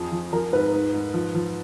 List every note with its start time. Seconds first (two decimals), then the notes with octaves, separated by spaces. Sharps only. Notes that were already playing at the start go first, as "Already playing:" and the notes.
Already playing: F2 F3 G#4
0.12 F3
0.33 F3 A#4
0.52 G#2 B4
0.74 G#2
0.94 G#2
1.14 F3
1.35 F3